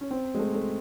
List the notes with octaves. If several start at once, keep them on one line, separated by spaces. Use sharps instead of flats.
C#4
C4
G#3
A3
A3